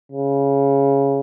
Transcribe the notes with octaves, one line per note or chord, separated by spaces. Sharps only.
C#3